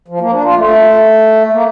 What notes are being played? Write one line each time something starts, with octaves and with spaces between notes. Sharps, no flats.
F3
A#3
D4
F4
A3
A#3